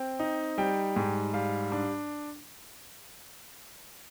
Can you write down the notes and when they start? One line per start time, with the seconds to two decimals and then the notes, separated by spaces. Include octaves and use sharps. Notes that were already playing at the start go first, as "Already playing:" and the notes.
Already playing: C4 G5
0.19 D#4
0.58 G3 G5
0.96 G#2
1.34 G3 F5
1.72 D4